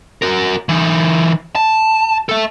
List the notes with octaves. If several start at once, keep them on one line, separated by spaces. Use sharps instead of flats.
F#4 A#4
E3 D#4
A5
A4 E5